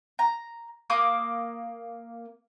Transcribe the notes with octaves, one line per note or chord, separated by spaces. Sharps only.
A#5
A#3 D6 D#6